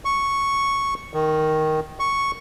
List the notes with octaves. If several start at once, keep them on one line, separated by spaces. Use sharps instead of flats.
C#6
D#3
C#6